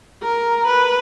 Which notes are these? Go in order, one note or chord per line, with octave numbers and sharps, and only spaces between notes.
A#4
B4